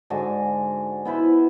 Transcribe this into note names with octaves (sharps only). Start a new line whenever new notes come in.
G#2 D3 F#4 G#5
B3 E4 B4 C5